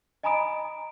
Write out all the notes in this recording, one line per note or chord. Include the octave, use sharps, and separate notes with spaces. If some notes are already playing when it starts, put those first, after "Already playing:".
D#5 G#5 A#5 B5 D#6 D7